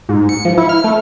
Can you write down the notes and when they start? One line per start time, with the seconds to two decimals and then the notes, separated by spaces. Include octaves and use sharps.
0.09 G#2
0.29 C#7
0.45 F3
0.58 E4
0.69 F6
0.84 A3